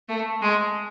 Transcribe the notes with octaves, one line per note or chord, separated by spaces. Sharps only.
A3
G#3